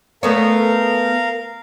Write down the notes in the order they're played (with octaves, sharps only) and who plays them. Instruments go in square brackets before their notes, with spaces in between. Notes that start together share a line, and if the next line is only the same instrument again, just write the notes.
[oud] A3 B3 C#5 [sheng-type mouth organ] A#4 F5